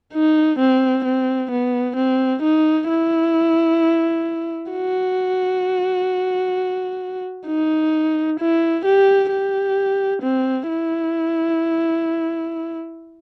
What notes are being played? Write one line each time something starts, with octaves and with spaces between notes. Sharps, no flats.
D#4
C4
C4
B3
C4
D#4
E4
F#4
D#4
E4
G4
G4
C4
E4